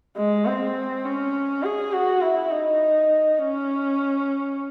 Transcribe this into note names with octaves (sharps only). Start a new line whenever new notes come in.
G#3
C4
C#4
G#4
F#4
E4
D#4
C#4